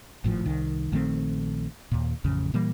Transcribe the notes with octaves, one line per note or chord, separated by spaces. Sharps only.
G#1 A2 F3
C2 D#3
A#1 D#3 A3 C4
D#2 A#2
A1 F2 C#3
A#2 E3 G3 A#3